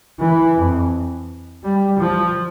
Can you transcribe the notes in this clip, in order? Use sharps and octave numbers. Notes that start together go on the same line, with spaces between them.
E3
F2
G3
F3